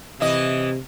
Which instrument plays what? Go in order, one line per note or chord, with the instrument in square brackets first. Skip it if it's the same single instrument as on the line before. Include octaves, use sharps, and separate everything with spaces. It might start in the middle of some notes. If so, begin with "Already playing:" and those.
[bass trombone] C3 [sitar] E3 E4 D#5